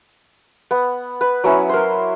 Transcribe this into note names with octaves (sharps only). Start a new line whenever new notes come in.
B3
B4
F#3 B3 C#4 E4
A#4 C5